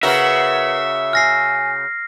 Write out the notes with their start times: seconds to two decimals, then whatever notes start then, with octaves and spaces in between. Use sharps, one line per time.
0.03 C#3 F#4 A#4 B4 E5
1.13 G#5 F6 A#6 C7